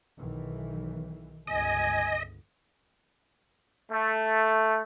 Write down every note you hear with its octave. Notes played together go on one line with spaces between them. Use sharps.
B1 D#3 E3
G1 C#2 D#5 G#5
A3